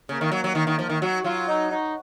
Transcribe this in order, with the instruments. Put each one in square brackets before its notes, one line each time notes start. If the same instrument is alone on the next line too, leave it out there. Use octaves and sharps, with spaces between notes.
[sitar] C#3 [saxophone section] A#3
[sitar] D#3
F#3
F#3
D#3
D#3
F3
D#3
[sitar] F#3 [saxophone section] F#4
[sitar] F#3 [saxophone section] F4
[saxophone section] D#4
D#4